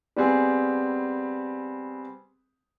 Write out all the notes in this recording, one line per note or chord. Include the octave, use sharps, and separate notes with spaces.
G3 B3 C4 G#4